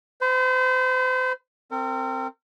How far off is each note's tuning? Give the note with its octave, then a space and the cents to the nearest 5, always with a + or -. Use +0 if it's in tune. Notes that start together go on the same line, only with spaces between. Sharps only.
C5 -35 B5 +0
C4 +0 A#4 -40